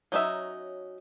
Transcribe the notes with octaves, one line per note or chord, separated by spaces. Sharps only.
F#3 C#4 D#4 G#4 E5